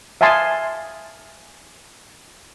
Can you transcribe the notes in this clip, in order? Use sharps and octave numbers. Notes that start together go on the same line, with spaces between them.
E5 F5 G#5 A5 C6 D#6